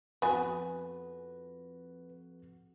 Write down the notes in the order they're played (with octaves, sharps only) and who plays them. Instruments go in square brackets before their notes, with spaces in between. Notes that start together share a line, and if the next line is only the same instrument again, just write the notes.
[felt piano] F2 F#4 F#5 [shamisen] B3 G#5 [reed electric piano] B4